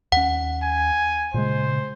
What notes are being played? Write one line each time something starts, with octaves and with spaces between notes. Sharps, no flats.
D#2 C#4 F#5
G#5
A#2 C#3 G#3 C5